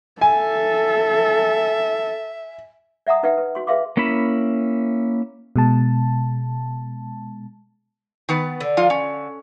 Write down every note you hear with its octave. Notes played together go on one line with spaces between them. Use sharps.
A4 E5 G#5
D5 E5 F#5 A#5 D#6
D#4 B4 D5 E5 F#5 G5
B4
F#4 C6
G#4 B4 E5 F5 C6 D6
A#3 C#4 E4 E5 B5
B2 G#3 A5
D#3 B3 B4
D3
F3 F4
C#4